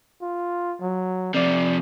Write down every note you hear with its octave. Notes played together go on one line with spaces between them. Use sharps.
F4
F#3
C3 F3 D5